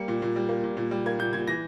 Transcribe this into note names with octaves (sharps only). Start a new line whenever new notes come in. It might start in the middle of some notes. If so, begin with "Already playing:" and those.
Already playing: G3 A#3 C#7
A#2
A#2
G3
A#3
A#2
A#2
G3
A#3 G#6
A#2 G6
A#2 G#6
E3 A#6